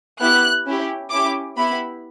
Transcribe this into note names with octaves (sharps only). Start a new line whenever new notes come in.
B3 E4 G4 F#6
C#4 E4 G4
C#4 E4 G4 D6
B3 E4 G4 B5